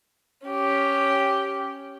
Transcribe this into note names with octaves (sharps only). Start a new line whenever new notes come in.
C#4 G4